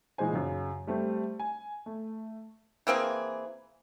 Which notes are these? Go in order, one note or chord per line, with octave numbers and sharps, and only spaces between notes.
A#2 E3 G#3 D#4 C5 G#5
F#2 C#3
G3 A3 C4
G#5
A3
E3 A#3 C4 G#4